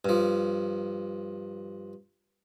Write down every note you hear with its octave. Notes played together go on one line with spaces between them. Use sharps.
G2 F3